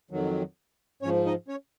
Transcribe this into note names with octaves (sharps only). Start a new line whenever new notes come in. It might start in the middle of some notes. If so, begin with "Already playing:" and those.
F2 D#3 F#3
G#2 F3 C#4 C#5
D#4 D#5
C#4 C#5